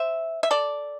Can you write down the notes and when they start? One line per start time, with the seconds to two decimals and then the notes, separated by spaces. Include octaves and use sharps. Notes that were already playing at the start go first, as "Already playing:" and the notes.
Already playing: C5 E5
0.43 E5
0.51 A4 D5